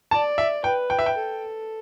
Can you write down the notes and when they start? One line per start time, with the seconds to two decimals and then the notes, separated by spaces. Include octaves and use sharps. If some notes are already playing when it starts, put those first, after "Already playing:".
0.11 D5 A5
0.38 E5
0.64 B4 G5
0.90 G5
0.99 E5
1.06 G5
1.16 A4